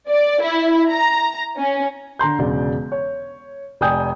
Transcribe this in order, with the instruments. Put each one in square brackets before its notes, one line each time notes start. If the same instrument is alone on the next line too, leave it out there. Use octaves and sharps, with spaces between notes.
[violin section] D5
E4
A#5
C#4
[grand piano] D3 A#5 C6 G6
E1 C#3 D5
C#5
F1 D5 G5 G#5 D#6 G6